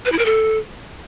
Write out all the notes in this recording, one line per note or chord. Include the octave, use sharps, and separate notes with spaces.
B4
E4
A#4
A4